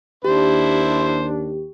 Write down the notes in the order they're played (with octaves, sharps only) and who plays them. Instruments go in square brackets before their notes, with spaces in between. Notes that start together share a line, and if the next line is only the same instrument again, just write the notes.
[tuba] D#2 [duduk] D4 [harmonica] E4 C5 [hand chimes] G4